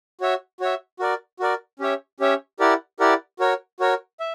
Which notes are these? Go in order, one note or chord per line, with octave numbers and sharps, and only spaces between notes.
F#4 C#5 E5
F#4 C#5 E5
F#4 A#4 D5
F#4 A#4 D5
C#4 G4 C#5 E5
C#4 G4 C#5 E5
E4 G4 A#4 D5 F#5
E4 G4 A#4 D5 F#5
F#4 A#4 C#5
F#4 A#4 C#5
E5